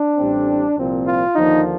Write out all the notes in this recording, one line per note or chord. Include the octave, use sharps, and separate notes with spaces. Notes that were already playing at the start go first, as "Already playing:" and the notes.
Already playing: D4
A1 A2 G3 C4
C2 A#2 F3 C4
F4
D#2 D3 F3 A#3 D#4